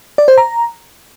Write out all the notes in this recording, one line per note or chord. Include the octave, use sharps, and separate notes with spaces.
D5
C5
A#5